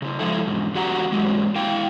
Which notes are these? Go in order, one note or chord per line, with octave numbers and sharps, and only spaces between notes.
C#3 E4
F3 G#3 E4 A4
E2 G#2
E2 F#4 G4 F#5 A#5
G#2 E3 F#3 G#3 A#3
E4 F5 G5